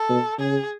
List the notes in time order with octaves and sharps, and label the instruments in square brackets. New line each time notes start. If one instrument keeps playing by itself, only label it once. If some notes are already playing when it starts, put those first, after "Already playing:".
Already playing: [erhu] A4
[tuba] B2
[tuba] C#3 [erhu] G#4